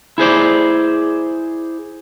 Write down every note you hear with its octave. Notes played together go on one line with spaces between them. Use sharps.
E4 G#4 C5 D5